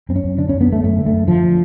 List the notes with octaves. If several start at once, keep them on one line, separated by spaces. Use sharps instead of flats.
F#2 C4
C#4
F#2
D3 D4
F#2 C#4
B3
D3 A3
F#2 A3
D3
A3
F#2
D3 F3
D3